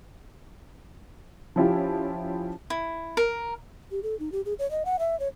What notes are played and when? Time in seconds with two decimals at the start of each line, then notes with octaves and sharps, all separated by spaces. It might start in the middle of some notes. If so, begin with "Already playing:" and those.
1.56 F3 C#4 E4 F4 G4
2.70 E4
3.17 A#4
3.91 G4
4.03 A4
4.19 D#4
4.32 G4
4.45 G#4
4.59 C#5
4.71 D#5
4.85 F#5
4.99 E5
5.20 C#5